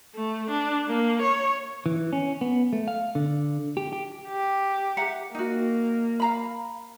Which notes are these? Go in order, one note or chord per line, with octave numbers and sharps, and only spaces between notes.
A3
D4
A#3
C#5
E3
C#4
B3
A3
F5
D3
G4
G4
G4
E5 F#5 A#5
A#3 D#4 F#4
F5 A#5 B5